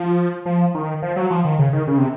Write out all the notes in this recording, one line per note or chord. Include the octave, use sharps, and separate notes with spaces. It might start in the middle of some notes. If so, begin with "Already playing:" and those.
Already playing: F3
F3
D#3
F3
F#3
F3
D#3
C#3
D#3
C#3
C3